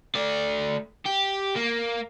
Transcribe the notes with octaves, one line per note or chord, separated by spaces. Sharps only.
A3 D5
G4
A#3